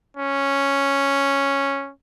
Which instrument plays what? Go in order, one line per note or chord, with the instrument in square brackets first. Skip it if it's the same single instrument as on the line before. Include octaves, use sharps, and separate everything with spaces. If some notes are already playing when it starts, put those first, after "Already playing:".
[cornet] C#4